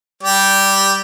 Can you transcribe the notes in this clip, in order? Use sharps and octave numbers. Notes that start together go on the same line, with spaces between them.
G3 G4 D5